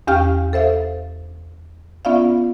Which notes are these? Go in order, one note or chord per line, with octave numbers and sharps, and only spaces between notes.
E2 C#4 G4 F5 G5 F6
A4 C5 E5 F5
B3 C#4 F4 D5 E5 F5